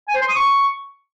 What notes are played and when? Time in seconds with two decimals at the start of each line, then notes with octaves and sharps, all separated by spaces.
0.08 G#5
0.15 C5
0.22 C6
0.29 D#6
0.36 C#6